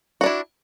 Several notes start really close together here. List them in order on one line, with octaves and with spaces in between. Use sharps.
F#4 D4 E4